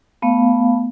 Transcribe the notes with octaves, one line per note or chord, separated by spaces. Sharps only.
A3 B3 F5